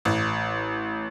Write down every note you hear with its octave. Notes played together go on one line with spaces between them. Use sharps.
A1